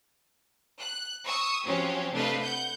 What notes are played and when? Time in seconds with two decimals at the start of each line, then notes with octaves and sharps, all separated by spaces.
0.79 F#6
1.25 C#6 D#6 E6
1.66 F3 F#3 C4 C#4 G4 C#5
2.12 C3 A3 D4 B4 D#5 F5
2.42 F#5 G6